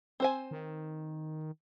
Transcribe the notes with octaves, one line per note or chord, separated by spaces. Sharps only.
C4 C5 G#5
D#3